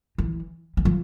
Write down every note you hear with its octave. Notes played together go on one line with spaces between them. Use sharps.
E3
E3
F3